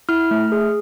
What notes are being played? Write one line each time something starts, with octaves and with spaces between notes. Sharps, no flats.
E4 F6
A3
G#4